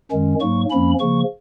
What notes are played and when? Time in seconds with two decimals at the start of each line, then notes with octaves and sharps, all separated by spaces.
0.11 F#2 D#3 G#3 C#4
0.41 G#2 F#3 A#3 C#6
0.70 F2 F3 A#3 C#4 B5
1.00 C#3 F3 A#3 C#6